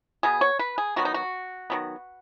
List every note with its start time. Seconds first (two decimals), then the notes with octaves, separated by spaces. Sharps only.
0.23 B2 B3 G#4
0.41 C#5
0.59 B4
0.78 G#4
0.96 D#3 F#3 B3 F#4
1.05 D#4
1.14 F#4
1.70 D#3 F#3 B3